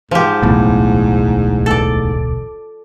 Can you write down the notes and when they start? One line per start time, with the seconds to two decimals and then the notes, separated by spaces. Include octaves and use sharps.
0.11 G#2 F3 G4
0.43 D1 B1 E2 A2
1.66 A4 D5